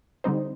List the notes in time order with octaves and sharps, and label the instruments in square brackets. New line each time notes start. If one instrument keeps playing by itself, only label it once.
[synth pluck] D3 G3 C4 D#4 C5